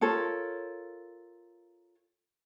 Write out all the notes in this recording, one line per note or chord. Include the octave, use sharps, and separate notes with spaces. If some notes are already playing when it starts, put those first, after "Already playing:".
F4 A4 A#4 C#5